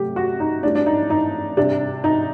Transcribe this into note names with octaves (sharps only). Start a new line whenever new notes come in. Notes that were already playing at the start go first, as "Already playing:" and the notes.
Already playing: C3 F#3 A3 G4
F#4
D#4
A2 G3 D4
D4
D#4
D#4
C3 G3 D4
D#4